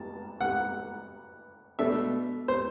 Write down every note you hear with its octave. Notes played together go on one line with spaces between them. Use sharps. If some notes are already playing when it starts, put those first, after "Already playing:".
Already playing: A5
F#5
B2 A3 D4 E5
C5